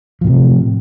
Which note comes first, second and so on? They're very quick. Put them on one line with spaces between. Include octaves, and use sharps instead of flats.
F3 A2 C3